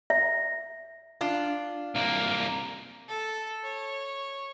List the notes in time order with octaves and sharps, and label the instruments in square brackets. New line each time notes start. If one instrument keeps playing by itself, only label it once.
[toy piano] E5
[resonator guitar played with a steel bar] D4 F4
[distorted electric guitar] C2 A#3
[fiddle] A4
C#5